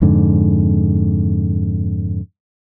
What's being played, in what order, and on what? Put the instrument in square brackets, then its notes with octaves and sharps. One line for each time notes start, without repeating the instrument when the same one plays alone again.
[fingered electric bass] F2 G#2 D3